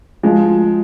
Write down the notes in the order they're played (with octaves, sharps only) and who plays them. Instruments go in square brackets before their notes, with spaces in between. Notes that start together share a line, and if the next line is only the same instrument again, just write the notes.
[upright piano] F3 G#3